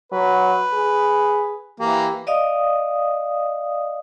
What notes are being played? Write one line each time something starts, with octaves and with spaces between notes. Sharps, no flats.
F#3 B4
G#4
E3 A#3 G4
D5 D#5 F5 D#6